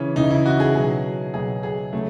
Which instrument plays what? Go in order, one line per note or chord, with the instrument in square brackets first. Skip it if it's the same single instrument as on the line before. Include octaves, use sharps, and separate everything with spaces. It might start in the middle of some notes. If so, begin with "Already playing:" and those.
Already playing: [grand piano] C#3 E3 C#4
C#3 E3 D#4
E4
F#4
G#4
B2 F#3 G#4
B2 F#3 G#4
G#4
C#3 F#3 A3